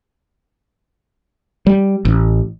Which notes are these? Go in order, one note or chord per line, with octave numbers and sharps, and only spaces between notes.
G3
A1